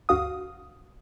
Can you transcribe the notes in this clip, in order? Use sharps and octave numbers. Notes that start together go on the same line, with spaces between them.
D2 G2 F#4 F5 D#6